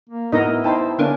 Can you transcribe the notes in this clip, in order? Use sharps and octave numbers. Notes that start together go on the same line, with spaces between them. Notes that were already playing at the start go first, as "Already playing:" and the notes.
A#3
A2 B3 D#4 E4 A#4 D#5
D#4 C5 G5 A5 B5
D3 A#3 B3 C#4 D4